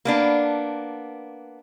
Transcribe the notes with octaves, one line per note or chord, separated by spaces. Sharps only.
A#3 B3 D4